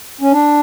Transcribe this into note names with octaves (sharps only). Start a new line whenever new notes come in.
C#4
D4